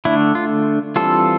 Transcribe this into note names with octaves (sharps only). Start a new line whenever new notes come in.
D3 A3 D4 E4
F4
E3 G3 C4 F4 A4